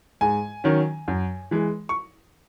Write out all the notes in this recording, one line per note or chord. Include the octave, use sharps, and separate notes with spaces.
G#2 G#5
D#3 F#3 C#4
F#2
E3 G#3
C#6